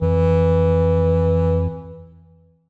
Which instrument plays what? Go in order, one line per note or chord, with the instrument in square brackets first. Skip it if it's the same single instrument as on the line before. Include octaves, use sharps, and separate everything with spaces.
[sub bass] F2 [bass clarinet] E3